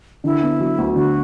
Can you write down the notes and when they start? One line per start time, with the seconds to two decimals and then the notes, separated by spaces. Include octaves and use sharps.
0.24 D3 E4
0.43 B3
0.60 F#3
0.78 D2
0.96 D3 F#4